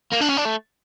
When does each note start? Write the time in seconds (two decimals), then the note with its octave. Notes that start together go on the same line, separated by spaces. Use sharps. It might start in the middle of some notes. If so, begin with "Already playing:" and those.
0.13 A#3
0.21 D4
0.30 C#4
0.37 D4
0.45 A3